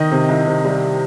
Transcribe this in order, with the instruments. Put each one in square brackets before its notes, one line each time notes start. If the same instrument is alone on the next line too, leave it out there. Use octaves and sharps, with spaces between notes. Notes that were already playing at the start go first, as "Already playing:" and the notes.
Already playing: [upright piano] D#3 D#5
C3
C2
C3
G3